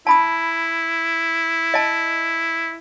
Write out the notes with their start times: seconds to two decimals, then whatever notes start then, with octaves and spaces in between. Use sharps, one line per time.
0.07 E4 A5 B5 D#6
1.74 D#5 A5